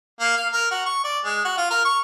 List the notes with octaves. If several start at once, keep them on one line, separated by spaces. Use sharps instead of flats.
A#3
F5
A#4
F#4
C#6
D5
G#3
F#4
F4
A#4
C#6